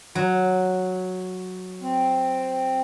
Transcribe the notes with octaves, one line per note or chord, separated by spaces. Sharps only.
F#3
C4